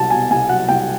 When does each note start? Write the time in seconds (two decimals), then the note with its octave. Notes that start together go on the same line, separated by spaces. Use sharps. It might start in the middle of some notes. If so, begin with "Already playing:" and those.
Already playing: C2 F#3 A5
0.10 B2 G#5
0.30 C2 G#5
0.49 F#3 F#5
0.69 C2 G5